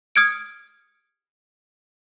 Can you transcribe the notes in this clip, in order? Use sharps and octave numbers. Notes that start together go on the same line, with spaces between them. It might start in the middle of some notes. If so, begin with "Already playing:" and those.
D#6 F6 G#6 C#7 D7